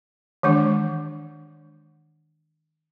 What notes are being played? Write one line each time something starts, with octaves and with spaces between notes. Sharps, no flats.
D#3 E3 G#3 D4